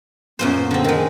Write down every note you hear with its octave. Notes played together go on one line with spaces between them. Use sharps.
F#2 A#2 B3 C5
D3 C4
D#3 G#3 A#4